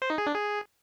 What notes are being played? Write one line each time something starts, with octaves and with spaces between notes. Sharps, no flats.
C5
D#4
G#4
D4
G#4